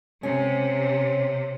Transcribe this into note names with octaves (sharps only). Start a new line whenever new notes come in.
C3 C#4